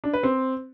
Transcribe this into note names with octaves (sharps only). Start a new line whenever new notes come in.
D4
B4
C4